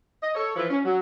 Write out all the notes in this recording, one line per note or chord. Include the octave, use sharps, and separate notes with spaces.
D#5
A4 C#5
E3 F3 E4 F4 B4
C#4
F#3